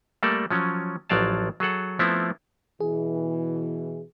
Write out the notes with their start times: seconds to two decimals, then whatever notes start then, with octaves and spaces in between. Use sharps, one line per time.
0.23 G3 A3 A#3 A4 D5
0.50 F3 F#3 C#4
1.10 A1 F3 F#3 D5 F5 A5
1.60 F#3 G#4 A4 F#5
1.99 F3 A3 B3 C4 E4
2.80 B2 E3 G#4